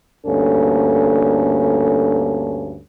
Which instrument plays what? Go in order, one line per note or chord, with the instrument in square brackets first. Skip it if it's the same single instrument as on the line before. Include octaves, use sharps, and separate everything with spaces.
[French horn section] D2 G2 A#3 C#4 A4